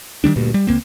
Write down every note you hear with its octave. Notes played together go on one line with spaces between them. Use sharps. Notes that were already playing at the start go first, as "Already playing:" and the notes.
D#3 F#3 G3 D4
D2 G2 A#2
G3
C#2 A2 A#3 C4